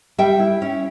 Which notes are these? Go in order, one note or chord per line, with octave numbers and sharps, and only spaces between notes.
G3 E5 G5
E4
C#4